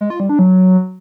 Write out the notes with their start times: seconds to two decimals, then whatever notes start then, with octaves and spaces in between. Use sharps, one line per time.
0.01 G#3
0.10 F4
0.20 G3
0.29 D4
0.39 F#3